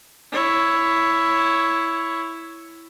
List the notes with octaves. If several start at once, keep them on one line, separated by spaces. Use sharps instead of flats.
E4 C#5